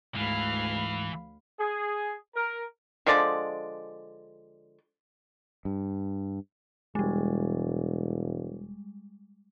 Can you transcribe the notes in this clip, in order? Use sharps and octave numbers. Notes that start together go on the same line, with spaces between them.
D2 G#2 E3 F5 B5
G#4
A#4
D3 F3 G#3 D5
G2
E1 G3 G#3